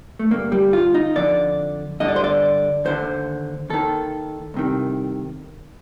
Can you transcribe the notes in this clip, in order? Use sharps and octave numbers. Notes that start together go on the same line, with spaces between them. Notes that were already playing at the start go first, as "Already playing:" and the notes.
A3
G2 D3 A#3
G3
F4
D#4
F2 D3 D5
G2 D3 D#5
D5
C5
D5
D#2 D3 C5
D#2 D#3 A4
C2 C3 D#3